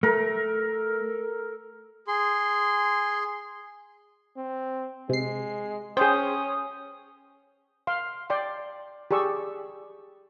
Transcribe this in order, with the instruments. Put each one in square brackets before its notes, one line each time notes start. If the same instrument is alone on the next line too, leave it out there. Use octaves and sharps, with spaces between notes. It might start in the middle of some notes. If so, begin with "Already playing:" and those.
[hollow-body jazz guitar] A3 [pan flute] A4 [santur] A#4
[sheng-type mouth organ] G#4 C6
[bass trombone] C4
[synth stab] C3 C7 [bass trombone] G#3
[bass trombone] C#4 [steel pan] G#4 C5 [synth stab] G5 [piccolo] D#6
[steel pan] F5 C6
D5 G5 C6
G4 G#4 D5 C#6 E6